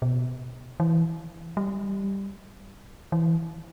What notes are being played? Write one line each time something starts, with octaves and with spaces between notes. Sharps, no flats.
B2
E3
G3
E3